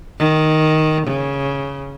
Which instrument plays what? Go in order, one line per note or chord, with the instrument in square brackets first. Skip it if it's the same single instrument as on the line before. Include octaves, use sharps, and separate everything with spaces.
[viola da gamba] D#3
C#3